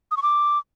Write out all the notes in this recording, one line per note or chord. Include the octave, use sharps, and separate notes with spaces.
D#6
C#6
D6